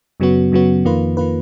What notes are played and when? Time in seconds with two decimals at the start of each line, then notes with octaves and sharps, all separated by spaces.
0.20 F#2 C#3 F#3 B3 F#4
0.52 F#2 C#3 F#3 B3 F#4
0.85 F2 D#3 A#3 F4 B4
1.17 D#3 A#3 F4 B4